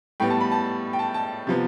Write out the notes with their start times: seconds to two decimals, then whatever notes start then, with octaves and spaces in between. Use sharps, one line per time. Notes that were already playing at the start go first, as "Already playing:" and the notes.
0.20 A2 G3 B3 G5
0.30 A5
0.41 B5
0.52 A5
0.93 G5
0.99 A5
1.14 A5
1.47 C3 F3 B3